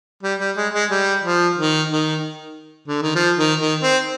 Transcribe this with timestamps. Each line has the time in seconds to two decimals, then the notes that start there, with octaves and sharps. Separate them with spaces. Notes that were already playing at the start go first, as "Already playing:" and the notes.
0.23 G3
0.39 G3
0.57 G#3
0.73 G#3
0.90 G3
1.24 F3
1.58 D#3
1.92 D#3
2.88 D3
3.02 D#3
3.15 F3
3.38 D#3
3.60 D#3
3.83 C4